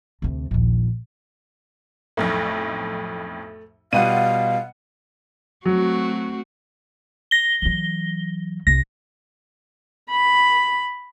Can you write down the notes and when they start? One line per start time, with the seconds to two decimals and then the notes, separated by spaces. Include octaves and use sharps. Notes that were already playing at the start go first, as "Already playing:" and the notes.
0.22 D2 C3
0.51 A#1 D#2
2.17 B1 F2 A2 A3
3.93 B2 G3 F4 F5 F#5 D#7
5.66 F#3 A3 C4 F#4
7.31 A#6 G7
7.62 E3 F#3
8.67 C2 A#6
10.10 B5